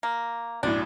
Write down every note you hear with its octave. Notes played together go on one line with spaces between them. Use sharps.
A#3
B1 F#2 A2 D4